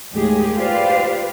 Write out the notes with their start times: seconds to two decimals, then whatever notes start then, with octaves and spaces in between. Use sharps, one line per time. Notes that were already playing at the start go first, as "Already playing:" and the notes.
0.14 D#2 A2 G#3 G4 G#4
0.56 F4 G4 B4 C5 D5 F5